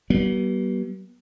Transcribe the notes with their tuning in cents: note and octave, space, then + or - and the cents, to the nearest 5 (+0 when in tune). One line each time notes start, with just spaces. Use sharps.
G3 -45 B3 -40